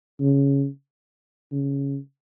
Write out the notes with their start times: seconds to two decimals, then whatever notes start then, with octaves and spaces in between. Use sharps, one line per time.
0.21 C#3
1.52 C#3